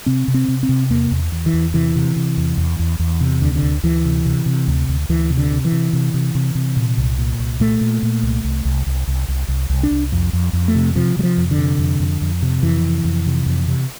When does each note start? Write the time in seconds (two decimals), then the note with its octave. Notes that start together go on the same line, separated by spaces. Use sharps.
0.06 C3 C4
0.28 C3
0.34 C4
0.48 C3
0.63 C4
0.69 C3
0.90 E2 A#3
1.11 E2
1.32 E2
1.46 E3
1.53 E2
1.74 C3 E3
1.95 C3
2.16 C3
2.37 E2
2.58 E2
2.79 E2
2.99 E2
3.21 C3
3.41 D2 D3
3.56 D3
3.62 D2
3.83 D2 E3
4.05 C3
4.25 C3
4.46 C3
4.68 D2
4.89 D2
5.09 D2 E3
5.30 C3
5.37 D3
5.51 C3
5.65 E3
5.72 C3
5.93 C3
6.14 C3
6.35 C3
6.55 C3
6.77 A#2
6.98 C2
7.18 A#2
7.39 C2
7.60 A#2 A3
7.81 A#2
8.03 A#2
8.23 C2
8.44 C2
8.65 C2
8.87 C2
9.07 C2
9.28 C2
9.48 C2
9.70 C2
9.83 D4
9.91 C2
10.12 F2
10.33 F2
10.53 F2
10.68 A3
10.75 C3
10.95 C3 F3
11.17 C3 G3
11.23 F3
11.38 F2
11.51 D3
11.58 C3
11.79 F2
12.00 F2
12.21 F2
12.42 C3
12.63 F2 E3
12.84 C3
13.05 F2
13.26 C3
13.46 F2
13.67 C3